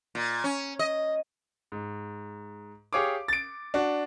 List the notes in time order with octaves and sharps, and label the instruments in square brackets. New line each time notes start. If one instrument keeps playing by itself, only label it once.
[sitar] A#2
C#4
D#5
[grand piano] G#2
G4 G#4 C#5 F5 D6
A6 D7
D4 F#4